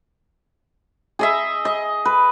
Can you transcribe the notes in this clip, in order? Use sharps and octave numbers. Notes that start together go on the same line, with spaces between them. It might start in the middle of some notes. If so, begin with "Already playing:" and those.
G#4 D#5 E5
D#5
B4